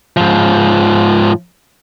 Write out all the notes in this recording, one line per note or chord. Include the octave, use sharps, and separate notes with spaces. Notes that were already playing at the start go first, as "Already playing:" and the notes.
G#2 F3